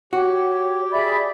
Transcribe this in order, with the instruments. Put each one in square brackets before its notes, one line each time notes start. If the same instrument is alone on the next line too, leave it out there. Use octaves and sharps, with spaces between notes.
[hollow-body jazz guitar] F#4 [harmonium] G4 [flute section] C#5
[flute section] G#4 E5 B5 [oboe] D5